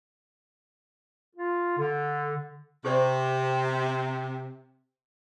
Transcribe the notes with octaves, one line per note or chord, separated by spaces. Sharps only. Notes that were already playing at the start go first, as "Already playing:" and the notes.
F4
D3
C3 G4 C5 D5